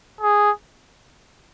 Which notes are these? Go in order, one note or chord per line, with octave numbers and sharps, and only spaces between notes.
G#4